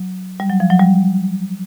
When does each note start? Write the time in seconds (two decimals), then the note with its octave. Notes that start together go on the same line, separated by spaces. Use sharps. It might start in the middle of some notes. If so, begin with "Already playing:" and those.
Already playing: F#3
0.40 G3
0.50 F#3
0.60 F3
0.70 F#3
0.80 G3